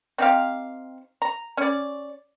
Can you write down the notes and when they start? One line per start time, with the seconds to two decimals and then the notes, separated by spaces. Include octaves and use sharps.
0.18 C4 D#4 G4 F5
1.22 A#5
1.57 C#4 D5